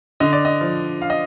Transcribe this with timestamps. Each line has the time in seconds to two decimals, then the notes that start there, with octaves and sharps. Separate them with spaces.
0.20 D3 D#5
0.33 D5
0.45 D#5
0.61 F3
1.02 F5
1.10 D#5